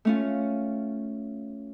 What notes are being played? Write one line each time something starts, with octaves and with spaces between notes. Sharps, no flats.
A3 C#4 F4